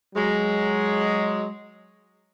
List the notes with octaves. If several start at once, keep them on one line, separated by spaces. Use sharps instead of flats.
F#3 G#3